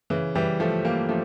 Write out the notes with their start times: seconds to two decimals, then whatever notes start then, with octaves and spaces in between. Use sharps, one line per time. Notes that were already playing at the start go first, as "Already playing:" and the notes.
0.10 C#3 E3
0.35 E3 G3
0.60 F3 A3
0.85 G3 A#3
1.09 F3 A3